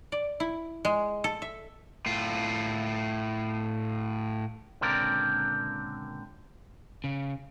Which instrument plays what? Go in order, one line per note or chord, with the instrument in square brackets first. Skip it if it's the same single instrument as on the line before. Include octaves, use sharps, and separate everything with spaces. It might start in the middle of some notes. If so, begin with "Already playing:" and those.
[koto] D5
E4
G#3
A4
E5
[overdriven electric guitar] A2 F4
[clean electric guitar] C#2 A#2 D3 C4 A#4 D5
[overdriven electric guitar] C#3